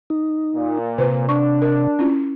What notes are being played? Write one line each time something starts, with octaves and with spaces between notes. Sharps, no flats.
D#4
A#2
C3 F4 B4 C5
D4 C#6
A#4
C#4 E4 F4